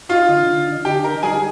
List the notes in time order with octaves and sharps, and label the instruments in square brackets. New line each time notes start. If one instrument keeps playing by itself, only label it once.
[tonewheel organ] D#4 [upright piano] F4 F5
[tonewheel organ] D3
D3
D#4
[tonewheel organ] D3 [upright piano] G4 G5
[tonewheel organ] D#4 [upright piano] A#4 A#5
[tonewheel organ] G3 [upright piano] G#4 G#5